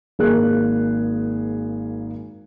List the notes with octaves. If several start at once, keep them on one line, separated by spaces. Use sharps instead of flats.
G#1 A#3 G#4 A#4 F#6